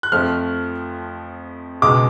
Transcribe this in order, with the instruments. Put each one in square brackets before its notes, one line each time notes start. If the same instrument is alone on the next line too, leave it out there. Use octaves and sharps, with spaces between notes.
[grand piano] F#6
F2 F3 A3 F6
C#2 B2 G#3 D6